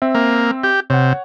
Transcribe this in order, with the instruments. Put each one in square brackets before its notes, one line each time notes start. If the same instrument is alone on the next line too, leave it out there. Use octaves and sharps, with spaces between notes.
[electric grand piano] C4 E5
[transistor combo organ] A#3
G4
[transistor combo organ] C3 [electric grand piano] C#5 F#5